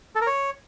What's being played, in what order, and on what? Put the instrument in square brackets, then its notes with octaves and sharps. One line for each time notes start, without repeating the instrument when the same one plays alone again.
[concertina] A4
A#4
C#5